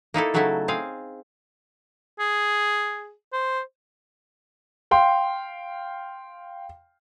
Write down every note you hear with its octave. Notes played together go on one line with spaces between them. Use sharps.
A#3 D#4 E4 A4
C#3 F#3 A3 D#4 E4 A4
C4 G#4 F5
G#4
C5
F5 G5 C6